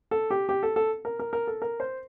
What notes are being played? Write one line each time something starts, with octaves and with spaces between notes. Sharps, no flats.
A4
G4
G4
A4
A4
A#4
A#4
A#4
A4
A#4
C5